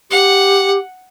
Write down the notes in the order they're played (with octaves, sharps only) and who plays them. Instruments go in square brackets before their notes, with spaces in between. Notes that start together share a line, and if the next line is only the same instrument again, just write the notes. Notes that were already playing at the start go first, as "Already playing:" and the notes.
[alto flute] G4 [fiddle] F#5